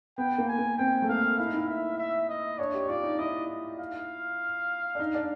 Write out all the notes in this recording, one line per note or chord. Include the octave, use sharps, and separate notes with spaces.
B3 G5
A#3
G#5
A#3
C4 G5
A3
A#3 F5
E4 F5
D#4
E4
E5
E5
D#5
D4 C#5
G4
F4 D5
D#4
E4 D#5
F5
D4
D#4
D4